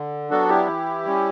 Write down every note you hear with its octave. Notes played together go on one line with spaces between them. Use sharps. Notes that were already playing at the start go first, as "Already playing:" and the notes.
Already playing: D3
F#3 B3 D4 F#4 A4
E4 G4
E3
G3 C#4